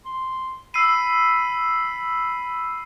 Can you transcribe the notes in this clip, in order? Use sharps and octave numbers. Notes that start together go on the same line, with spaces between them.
C6
B5 E6 C7 D#7